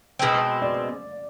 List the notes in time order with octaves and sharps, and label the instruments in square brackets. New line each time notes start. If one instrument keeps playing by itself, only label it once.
[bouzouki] B2 G#3 C4
[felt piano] D5